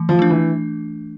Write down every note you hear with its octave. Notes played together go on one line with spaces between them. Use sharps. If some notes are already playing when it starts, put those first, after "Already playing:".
Already playing: E3 A3
F3
A3 D4
E3